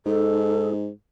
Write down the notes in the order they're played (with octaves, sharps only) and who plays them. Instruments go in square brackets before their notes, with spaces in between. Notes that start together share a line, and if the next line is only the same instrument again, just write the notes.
[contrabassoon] G#2 [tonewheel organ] D#4 [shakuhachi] A4